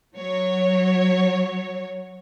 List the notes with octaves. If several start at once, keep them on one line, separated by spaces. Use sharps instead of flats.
F#3 C#5